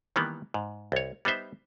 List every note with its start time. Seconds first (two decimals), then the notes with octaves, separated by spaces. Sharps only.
0.16 D#3 E3 G3 A#3 B3
0.54 G#2
0.92 C2 C#5
1.25 G3 B3 D#4 C5 E5